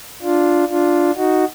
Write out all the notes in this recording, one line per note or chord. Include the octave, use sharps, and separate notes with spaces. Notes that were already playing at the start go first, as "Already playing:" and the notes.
D4 F4
D4 F4
D#4 F#4